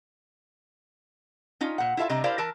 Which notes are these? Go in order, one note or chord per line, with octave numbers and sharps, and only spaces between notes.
C#4 D#4 F4
A#2 F#5
E4 F4 A4 E5 F5
C3 G3 D4 D#5 A#5
E4 G4 A#4 C5 D5 F5
E3 A#4 A5